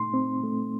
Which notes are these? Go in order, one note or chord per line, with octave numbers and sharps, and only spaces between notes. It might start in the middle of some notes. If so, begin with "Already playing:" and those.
Already playing: A#2 A3 D#4 C6
C4
A3